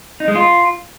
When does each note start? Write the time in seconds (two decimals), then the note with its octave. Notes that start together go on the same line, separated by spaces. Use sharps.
0.20 D#4
0.28 G#3
0.35 F4